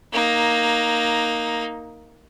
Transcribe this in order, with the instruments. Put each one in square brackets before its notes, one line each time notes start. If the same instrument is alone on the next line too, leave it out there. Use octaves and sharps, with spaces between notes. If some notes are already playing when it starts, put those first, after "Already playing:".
[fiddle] A#3 D#4